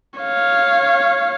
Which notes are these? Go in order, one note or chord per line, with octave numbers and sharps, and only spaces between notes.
C#5 F5